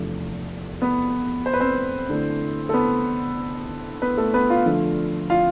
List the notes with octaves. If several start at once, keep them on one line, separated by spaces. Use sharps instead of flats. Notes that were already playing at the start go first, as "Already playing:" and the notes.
Already playing: E2 C3 F3 A3 D4
B3 B4
C5
B4
C4 C5
D3 A3 E4
A4
B3 B4
B3 B4
A3 A4
B3 B4
F4 F5
D3 F3 A3 D4 F4
F4 F5